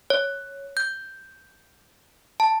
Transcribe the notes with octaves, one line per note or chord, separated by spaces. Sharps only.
C#5
G6
A5